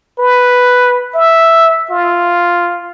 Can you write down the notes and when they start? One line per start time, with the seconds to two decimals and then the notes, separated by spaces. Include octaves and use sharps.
0.19 B4
1.15 E5
1.91 F4